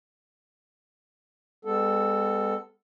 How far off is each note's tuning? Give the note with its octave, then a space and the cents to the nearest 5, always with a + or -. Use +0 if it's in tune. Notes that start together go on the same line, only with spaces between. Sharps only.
G#3 -45 B3 +20 A4 +0